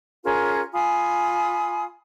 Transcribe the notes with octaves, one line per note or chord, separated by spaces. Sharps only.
C#4 F4 G#4 A#4
F4 G#5 B5 D#6